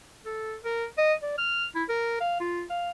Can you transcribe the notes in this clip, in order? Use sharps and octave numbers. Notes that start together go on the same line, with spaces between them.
A4
A#4
D#5
D5
F6
E4
A#4
F5
F4
F5